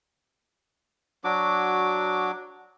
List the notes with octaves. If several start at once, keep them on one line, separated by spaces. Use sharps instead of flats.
F#3 D4 F#4 D6